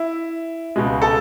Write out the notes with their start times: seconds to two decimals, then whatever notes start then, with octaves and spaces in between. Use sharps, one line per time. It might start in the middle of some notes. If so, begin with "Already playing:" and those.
Already playing: E4
0.76 C#2 B2 G#3
1.02 A4